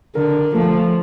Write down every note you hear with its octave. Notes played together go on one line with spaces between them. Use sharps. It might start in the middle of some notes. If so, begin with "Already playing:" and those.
D3 A#4
F3 A3